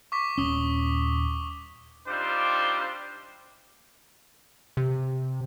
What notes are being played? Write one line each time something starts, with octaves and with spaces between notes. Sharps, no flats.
C#6 D6 B6
D#1 C#4 D#6 G7
G3 C4 D4 D#4 F4 C5
C3